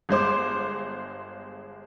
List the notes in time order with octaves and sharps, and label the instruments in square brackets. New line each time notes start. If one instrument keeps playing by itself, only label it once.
[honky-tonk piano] G1 G#3 C5 D6